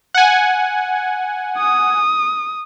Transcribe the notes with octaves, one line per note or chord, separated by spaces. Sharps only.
F#5 G#5
D#6